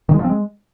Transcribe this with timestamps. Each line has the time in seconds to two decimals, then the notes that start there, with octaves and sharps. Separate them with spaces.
0.09 D#3
0.14 G#3
0.19 F3
0.24 C4
0.29 G#3